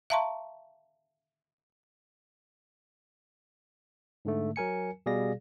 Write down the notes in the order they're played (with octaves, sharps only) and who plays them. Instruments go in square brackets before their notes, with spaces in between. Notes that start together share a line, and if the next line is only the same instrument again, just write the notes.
[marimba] E5 F5 A5 A#5 C6 C#6
[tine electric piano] G#2 D3 A3
F#3 A#4 G#5 C#7
B2 G3 G#4 D5 F5 A#6